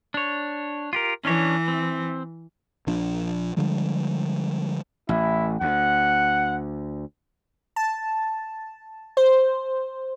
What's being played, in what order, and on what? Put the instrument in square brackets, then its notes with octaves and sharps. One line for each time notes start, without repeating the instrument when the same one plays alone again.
[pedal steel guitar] D4 C#5
F4 G4 A#4
[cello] E3 [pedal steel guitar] C#4 D4 C#5
[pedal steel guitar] C4
[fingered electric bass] A#1 F3 D4
D3 F3 G3 G#3
[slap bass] A1 [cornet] E4
[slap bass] D2 [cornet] F#5
[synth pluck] A5
C5